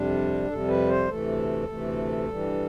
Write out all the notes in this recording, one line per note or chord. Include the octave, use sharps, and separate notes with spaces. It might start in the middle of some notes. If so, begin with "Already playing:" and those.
Already playing: F2 C3 G3 D4
F2 C3 G3 A4
B4
C5
D2 C3 E3 A3 A4
D2 C3 E3 A3
G2 E3 G3